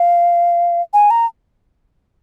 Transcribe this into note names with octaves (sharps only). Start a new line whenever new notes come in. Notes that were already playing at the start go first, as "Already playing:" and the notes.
Already playing: F5
G#5
A#5